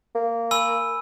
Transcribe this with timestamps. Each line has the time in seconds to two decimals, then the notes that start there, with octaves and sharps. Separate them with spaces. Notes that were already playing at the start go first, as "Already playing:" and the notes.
0.15 A#3
0.51 G#5 B5 E6